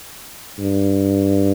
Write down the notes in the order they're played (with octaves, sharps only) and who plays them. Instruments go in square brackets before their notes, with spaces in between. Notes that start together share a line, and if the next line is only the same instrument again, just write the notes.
[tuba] G2